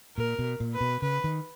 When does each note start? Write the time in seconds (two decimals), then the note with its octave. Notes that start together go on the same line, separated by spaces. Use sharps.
0.17 A#2 A#4
0.39 B2
0.60 A#2
0.74 B4
0.81 B2
1.02 C#3 B4
1.24 D#3